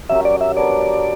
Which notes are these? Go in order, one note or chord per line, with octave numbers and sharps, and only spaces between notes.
F#3 C#4 G4 A#4 E5
D5
E5
B3 D4 A#4 C#5 D5